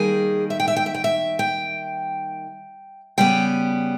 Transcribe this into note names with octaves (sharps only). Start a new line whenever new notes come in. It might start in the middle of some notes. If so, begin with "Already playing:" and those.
Already playing: D#3 G3 A#3 G#4
E5
G5
E5
G5
E5
G5
E5
G5
C#3 G3 B3 G5